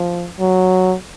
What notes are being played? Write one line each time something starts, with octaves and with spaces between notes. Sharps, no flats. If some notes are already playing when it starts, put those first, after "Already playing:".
Already playing: F3
F#3